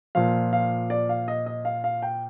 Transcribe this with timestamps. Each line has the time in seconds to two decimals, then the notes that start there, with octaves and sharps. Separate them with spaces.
0.15 A#2 F3 F5
0.53 F5
0.90 D5
1.09 F5
1.28 D#5
1.46 D#5
1.65 F5
1.84 F5
2.02 G5